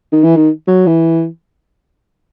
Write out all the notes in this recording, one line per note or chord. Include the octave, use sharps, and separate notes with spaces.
D#3
E3
D#3
F#3
E3